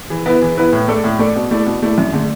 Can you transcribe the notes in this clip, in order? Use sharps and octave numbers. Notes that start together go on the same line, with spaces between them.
E3
B3 E4 B4
E3
B3 E4 B4
A2
A3 D4 A4 D5
A2
A3 D4 A4 D5
B2
A3 E4 D5
B2
A3 E4 D5
F#2
D3 A3